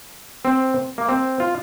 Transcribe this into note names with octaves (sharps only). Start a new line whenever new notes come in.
C4
A#3
C4
F4